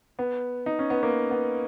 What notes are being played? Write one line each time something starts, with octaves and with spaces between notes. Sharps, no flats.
B3
D#4
C#4
B3
A#3
B3